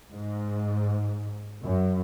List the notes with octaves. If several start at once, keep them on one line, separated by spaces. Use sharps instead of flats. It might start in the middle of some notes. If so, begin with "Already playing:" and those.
G#2
F#2